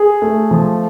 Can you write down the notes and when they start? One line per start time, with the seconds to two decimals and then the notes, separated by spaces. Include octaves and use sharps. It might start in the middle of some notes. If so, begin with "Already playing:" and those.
Already playing: G#4
0.22 A3
0.51 F3